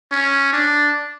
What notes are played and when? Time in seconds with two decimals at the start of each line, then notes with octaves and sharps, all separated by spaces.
0.12 C#4
0.53 D4